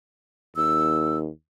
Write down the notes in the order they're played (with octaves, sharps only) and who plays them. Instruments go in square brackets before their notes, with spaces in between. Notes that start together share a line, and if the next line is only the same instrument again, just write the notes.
[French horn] D#2 [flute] E6